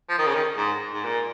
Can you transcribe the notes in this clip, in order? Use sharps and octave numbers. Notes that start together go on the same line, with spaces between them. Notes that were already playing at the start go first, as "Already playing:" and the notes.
F3
D#3
C#3
D#3
G#2
G#2
A#2